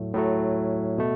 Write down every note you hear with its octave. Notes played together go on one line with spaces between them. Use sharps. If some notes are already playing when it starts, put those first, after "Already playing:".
Already playing: A2 F#3 A3
A2 F#3 A3
B2 A3